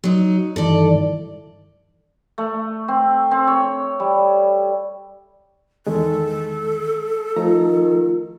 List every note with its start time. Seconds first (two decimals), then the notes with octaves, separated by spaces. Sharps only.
0.04 F#3 D#4
0.56 G2 D#3 E3 A4 D5
2.38 A3
2.88 C4
3.31 C4
3.47 C#5
4.00 G3
5.87 E2 D#3 G#3 A4
7.36 D#3 F3 A3 F4 A#5